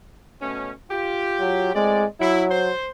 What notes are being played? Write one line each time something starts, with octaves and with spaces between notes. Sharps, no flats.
B2 A3 C#4
F4 G4
F#3
A2 G#3 C4 D5
F#3 E4
C5